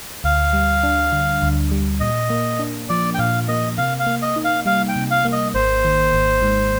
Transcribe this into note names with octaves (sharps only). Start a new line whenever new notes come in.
D2 F5
G3
D4
D3
D2
G3
A#2 D#5
A#3
D4
F3 D5
G5
A#2 F5
A#3 D#5
C3 F5
F5
A#3
D#5
D#4
F5
G3 F5
G5
C3
F5
A#3
D#5
G#1 C5
D#3
G#1
G#2